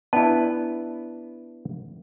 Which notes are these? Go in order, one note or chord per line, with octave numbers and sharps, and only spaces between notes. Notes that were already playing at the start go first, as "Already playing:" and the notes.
B3 D4 E4 A5